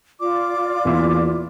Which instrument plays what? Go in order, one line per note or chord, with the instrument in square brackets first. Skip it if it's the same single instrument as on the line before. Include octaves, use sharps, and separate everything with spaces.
[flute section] F4 D5 [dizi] D6
[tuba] E2 [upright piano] A#2 E3 E4